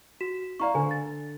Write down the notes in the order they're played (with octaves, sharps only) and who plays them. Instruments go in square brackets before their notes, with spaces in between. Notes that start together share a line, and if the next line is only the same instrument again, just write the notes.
[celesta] F#4 B6 E7
[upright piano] E4 F5 [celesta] D5 A#5 C#6
[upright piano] D3 [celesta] C5 G#5
[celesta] A6